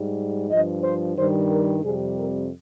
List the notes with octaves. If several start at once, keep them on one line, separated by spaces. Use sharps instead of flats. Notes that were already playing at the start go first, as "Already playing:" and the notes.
Already playing: G#2 G3
G2 F3 D#5
C5
G2 D#3 G3 C5
A#4
F2 C3 G3 G#4
A#4